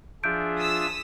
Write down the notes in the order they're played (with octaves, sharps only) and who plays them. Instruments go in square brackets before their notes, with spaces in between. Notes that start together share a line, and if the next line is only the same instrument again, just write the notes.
[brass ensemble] F3 G#4 [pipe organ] D4 F4 E5 [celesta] G6 D7
[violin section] D#6 E6 B6